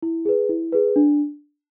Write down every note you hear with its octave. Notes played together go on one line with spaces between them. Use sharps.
E4
G#4 B4
E4
G#4 B4
D4